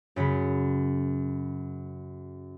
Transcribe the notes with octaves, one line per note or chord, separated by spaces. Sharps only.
F#2 C#3 F#3 B5